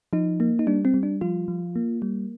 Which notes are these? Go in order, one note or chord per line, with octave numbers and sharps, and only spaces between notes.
F3 D#4
A#3
D#4
G3 D4
C4
G3
D4
F3 F4
F3
A#3
G3